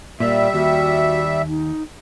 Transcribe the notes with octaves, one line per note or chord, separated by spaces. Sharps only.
A#2 G3 A#3 D5 E5
D#2 F#4
D#4